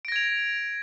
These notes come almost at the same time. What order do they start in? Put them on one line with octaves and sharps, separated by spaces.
D7 A#6 G#6 F7